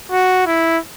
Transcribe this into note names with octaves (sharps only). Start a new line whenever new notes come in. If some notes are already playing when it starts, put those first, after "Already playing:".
F#4
E4